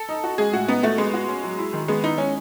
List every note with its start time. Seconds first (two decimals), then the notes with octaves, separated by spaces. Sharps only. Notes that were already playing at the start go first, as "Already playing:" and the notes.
Already playing: A4
0.09 D#4
0.24 F#4
0.38 G#3 G#4
0.52 A2 F#4
0.68 B3 D#4
0.83 A3 F#4
0.98 G#3 B3
1.14 F#4
1.28 C#4
1.44 F#3
1.58 E4
1.73 D#3
1.88 G#3 B3
2.04 D#4 E4
2.18 G#3 C#4